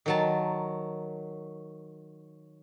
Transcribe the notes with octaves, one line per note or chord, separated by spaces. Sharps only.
D#3 F#3 A5